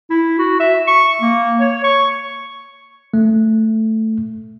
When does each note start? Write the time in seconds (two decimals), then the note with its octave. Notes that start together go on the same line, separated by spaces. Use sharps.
0.10 E4
0.39 F#4
0.60 E5
0.87 C#6
1.22 A#3
1.60 C#5
1.84 C#6
3.14 A3